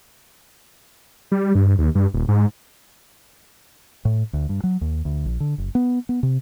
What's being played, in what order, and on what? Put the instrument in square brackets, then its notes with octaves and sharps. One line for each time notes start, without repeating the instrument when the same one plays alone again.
[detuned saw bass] G3
G2
D#2
G2
D#1
G#2
[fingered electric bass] A2
D2
G2
F#3
D#2
D2
A#1
D3
F#1
B3
B3
C3